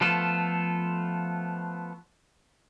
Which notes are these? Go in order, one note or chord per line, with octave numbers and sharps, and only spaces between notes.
F3 A3 B3 F4 A4